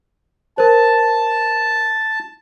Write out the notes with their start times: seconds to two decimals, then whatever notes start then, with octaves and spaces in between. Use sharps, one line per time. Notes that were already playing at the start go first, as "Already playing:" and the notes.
0.58 A#4 C5 A5